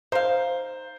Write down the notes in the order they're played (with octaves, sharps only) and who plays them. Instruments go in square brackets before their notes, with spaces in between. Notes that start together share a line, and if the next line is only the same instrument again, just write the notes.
[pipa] D#4 F5 [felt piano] C5